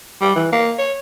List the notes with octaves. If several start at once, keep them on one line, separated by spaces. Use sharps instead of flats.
G3
E3
A#3
C#5